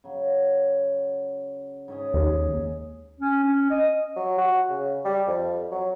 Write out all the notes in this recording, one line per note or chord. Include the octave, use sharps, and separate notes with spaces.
C#3 F#3
G#2 C#4 D#5
D#2
C#4
C#4
D#5
F#3
F#4
C#3
G3
F2
F#3